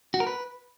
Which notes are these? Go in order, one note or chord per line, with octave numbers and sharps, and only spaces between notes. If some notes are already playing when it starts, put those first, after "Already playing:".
F#4
A#4
B4